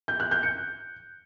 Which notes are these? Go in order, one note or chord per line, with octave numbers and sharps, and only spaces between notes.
G6
F#6
G6
C#7